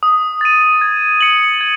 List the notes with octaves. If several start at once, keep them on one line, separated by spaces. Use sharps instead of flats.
D#6
A6 D#7
G#6
C#7 F#7
G#6